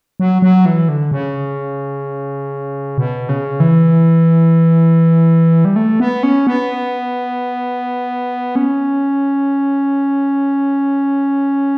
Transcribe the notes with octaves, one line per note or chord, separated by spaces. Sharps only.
F#3
F#3
E3
D3
C#3
B2
C#3
E3
G3
A3
B3
C#4
B3
C#4